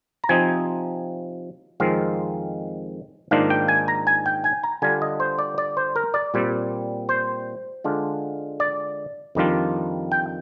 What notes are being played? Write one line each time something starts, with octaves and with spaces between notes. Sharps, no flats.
A#5
C3 F3 C4 D#4 G#5
F2 D#3 G#3 C4 F4 F5
G#2 D#3 A#3 D4 F4 F5
G5
G#5
A#5
G#5
G5
G#5
A#5
D3 G3 D4 F4 G#5
D#5
C5
D5
D5
C5
A#4
D5
A#2 G3 C4
C5
D3 G#3 D4 F4
D5
F2 D#3 G3 D4 F4
G5